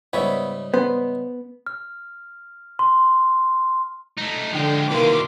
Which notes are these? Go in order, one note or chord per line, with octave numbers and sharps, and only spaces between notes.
G#2 C#3 G3 B3 C#5 E5
B3 C5
F6
C6
A3 D#4
D3 F3 G#3 G5
C2 B2 D#3 E3 A#3 C6 D6